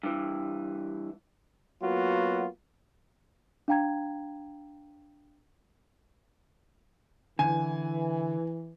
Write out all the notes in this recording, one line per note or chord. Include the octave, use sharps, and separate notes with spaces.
G2 E3
F#3 A#3 B3 F4 F#4
D4 F5 G5 A#5 G#6
D3 E3 G#5